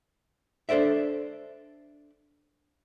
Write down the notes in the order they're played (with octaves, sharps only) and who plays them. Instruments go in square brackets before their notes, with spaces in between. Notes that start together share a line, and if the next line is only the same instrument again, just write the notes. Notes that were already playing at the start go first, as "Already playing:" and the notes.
[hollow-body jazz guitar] D4 A4 C5 D5 E5